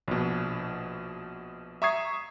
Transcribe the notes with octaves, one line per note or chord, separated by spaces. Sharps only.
A#1 B2
E5 A#5 C#6 D#6 G#6 C7